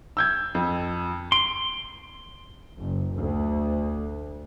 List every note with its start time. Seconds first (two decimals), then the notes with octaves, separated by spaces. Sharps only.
0.17 E6 G6 G#6
0.55 F2
1.32 C6 D7
2.79 F#1
3.16 D2